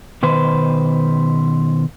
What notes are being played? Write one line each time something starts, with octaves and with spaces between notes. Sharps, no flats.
B2 D#3 B4 C5